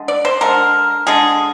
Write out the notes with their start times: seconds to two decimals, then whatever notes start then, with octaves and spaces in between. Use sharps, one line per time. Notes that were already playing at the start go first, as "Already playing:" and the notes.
Already playing: D3 G#3
0.08 D5
0.25 C5
0.41 D3 G#3 A#4
1.07 D3 G#3 G#4